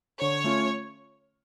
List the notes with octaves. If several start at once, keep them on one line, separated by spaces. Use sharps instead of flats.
D3 C#5
A3 C#4 F4